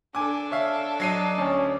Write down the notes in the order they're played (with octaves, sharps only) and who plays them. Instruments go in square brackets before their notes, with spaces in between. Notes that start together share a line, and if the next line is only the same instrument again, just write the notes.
[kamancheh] D4 A4 [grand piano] G#5 D6
[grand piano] C#5 E5 F5
[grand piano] F#3 C7 D#7 [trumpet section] D5 D#5
[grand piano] D2 [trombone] C#4